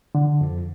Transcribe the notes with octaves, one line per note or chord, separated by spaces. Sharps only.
D3
F2